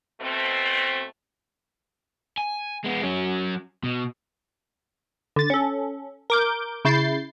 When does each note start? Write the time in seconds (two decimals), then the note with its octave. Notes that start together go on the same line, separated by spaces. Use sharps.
0.21 B2 A3 C4
2.38 G#5
2.85 G#3 B3
3.03 F#3 C#4
3.84 B2
5.36 D3 A6
5.50 C#4 A4
6.30 A#4 D6 G6
6.85 C#3 E4 G6 A6 C7